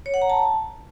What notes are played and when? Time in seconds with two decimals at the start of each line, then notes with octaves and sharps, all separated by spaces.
0.06 C#5
0.14 F#5
0.22 A#5
0.30 A5